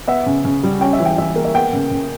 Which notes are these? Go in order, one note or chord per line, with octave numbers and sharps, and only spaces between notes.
B3 E5
C#3
C#3
G3
C#4 G5
E5
E3
G5
E3 E5
A#3
E5
B3 G5
C#3
C#3